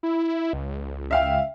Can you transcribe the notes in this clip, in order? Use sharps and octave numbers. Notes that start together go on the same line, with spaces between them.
E4
C#2
E5 F5 G5